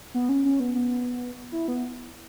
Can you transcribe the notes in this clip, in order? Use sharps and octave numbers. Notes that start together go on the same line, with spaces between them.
B3
C#4
C#4
B3
B3
E4
B3